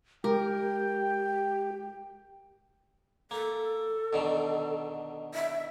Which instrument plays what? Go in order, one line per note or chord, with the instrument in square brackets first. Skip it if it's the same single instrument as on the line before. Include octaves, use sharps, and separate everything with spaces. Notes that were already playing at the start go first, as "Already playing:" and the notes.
[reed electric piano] G#3 [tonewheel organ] G4 [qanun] A#4 [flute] G5
[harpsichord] A#3 [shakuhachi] A4
[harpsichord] B2 D3 D#3
[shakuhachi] E5